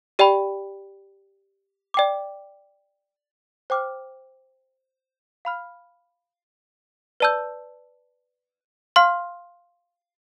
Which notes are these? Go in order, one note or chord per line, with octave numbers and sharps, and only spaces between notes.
G4 D5 G5 B5
D5 G5 D6
C5 G5 D6 F6
F5 B5 F6
B4 D5 A5 E6 G6
F5 C6 F6